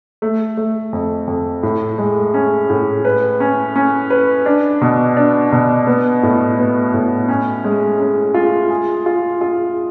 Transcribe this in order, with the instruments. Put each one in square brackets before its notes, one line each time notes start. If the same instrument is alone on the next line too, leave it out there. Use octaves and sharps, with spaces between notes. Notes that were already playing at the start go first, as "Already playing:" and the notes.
[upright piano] A3
A3
F2
F2
A2
G#3
C#4
A2
B4
C#4
C#4
B4
D4
B2
D4
B2
B3
A2
B3
A2
C#4
G#3
C#4
F4
G#4
F4
F4